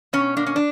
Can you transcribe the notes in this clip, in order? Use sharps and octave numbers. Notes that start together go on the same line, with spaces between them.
B2 C#4
A#3 D4
C#4
D4